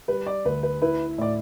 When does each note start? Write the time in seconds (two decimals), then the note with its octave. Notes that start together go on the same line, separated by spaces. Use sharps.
0.08 G3 B4
0.27 D5
0.45 D2 B4
0.63 B4
0.82 E4 B4
1.18 A2 D5